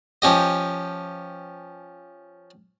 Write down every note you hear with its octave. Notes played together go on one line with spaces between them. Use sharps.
F3 C#4 G4 D#5